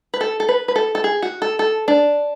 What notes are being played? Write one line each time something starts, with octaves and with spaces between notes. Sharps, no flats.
B4
A4
A4
B4
B4
A4
A4
G#4
F#4
A4
A4
D4